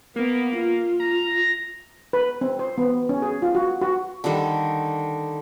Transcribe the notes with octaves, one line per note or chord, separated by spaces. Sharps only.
A#3 B3
F4
A#5
B4
C4
C5
B3
C#4
G#4
F4
F#4
F#4
D3 D#3 G3 A4